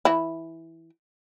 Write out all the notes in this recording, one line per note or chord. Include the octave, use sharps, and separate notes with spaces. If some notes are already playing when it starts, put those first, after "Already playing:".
E3 E4